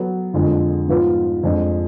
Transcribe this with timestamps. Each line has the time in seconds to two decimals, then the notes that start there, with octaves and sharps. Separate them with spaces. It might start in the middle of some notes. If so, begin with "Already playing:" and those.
Already playing: F#3 B3 F#4 A4
0.34 F2 D3 G#3
0.88 G#2 F3 B3 F4 B4
1.43 F2 F3 G#3 D4